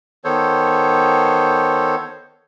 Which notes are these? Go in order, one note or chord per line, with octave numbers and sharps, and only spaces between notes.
D#3 B3 A4 C5 C#5